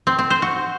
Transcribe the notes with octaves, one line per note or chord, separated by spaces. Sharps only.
C4
C4
C5
F#4